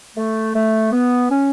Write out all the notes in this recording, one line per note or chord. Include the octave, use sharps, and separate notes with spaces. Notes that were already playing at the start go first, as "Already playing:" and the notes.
A3
A3
B3
C#4